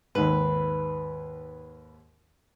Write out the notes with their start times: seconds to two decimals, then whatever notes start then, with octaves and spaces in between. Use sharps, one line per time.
0.15 D#2 G#2 B4